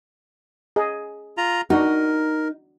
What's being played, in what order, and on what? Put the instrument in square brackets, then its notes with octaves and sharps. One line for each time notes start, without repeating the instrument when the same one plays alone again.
[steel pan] G#4 D#5
[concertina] F4 A#5
[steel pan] D4 F#4 [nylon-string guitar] D#4 [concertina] A#4